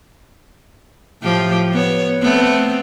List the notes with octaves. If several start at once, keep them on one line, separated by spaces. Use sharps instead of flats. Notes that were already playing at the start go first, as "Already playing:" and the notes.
A2 F3 G4
B3 C#5
A3 B3 C4